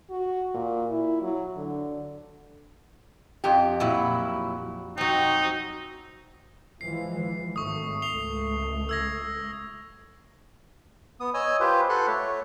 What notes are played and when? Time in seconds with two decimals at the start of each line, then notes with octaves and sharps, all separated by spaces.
0.10 F#4
0.54 A#2
0.90 E4
1.22 F#3
1.56 D3
3.44 F2 G4
3.80 A#2 F#3 E4
4.98 F#3 C4 D#4
6.81 E3 F3 G#3 C7
7.56 G#1 A3 C#6 D#6
8.02 C#2 A3 C7 F7 G7
8.89 E6 G#6 A#6
11.20 B3 D#6
11.34 C#5 D#5 G#5 E6
11.60 F4 G4 B4 C5
11.89 A4 B4 F#5 C6
12.07 A3 C#5